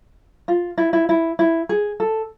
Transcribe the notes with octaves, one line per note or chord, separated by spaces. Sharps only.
F4
E4
E4
E4
E4
G#4
A4